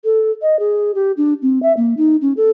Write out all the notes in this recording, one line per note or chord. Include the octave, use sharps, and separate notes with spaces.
A4
D#5
G#4
G4
D4
C4
E5
A#3
D#4
C#4
A4